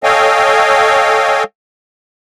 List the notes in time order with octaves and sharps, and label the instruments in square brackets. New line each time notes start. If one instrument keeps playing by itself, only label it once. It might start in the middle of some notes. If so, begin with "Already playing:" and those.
[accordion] A4 C#5 D#5 F5 G5 G#5